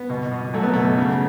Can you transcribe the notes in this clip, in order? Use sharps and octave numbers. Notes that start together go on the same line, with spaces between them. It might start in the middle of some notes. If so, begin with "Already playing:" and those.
Already playing: B3
B2
B2
F#3 A3
B3
B2 A3
C#3